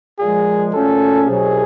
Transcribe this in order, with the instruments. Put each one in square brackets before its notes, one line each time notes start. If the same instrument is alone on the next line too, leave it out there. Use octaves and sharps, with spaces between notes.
[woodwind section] A#2 F3 G#3 [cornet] G#4
[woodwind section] A#2 F#3 A3 C#4 [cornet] A4
[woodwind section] C2 B2 F#3 [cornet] G#4